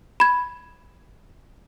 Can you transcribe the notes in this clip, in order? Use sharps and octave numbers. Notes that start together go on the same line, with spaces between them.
B5 G#6